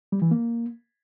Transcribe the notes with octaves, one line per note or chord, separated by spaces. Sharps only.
G3
E3
A#3